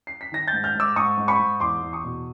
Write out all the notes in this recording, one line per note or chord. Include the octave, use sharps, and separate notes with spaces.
C7
B6
D#3 A#6
G6 A6
G#2
F6 G6
G#2 D6 E6
G#2 C#6 D#6
G#2
B5 C#6
G#2
E2 C6 D6
E2
C#6 D#6
B2